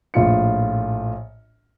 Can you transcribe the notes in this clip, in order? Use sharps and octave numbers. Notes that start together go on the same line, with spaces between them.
A#1 A2 F4 C#7